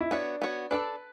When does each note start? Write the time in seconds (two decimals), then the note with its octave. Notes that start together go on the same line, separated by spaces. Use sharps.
0.01 E4
0.11 B3 D4 F#4 C#5
0.42 B3 F#4 C#5
0.71 D4 A4 B4 D5